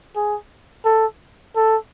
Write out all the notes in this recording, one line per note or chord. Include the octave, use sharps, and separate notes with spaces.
G#4
A4
A4